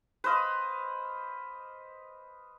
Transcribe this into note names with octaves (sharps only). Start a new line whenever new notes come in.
B4 C5 D#5 F5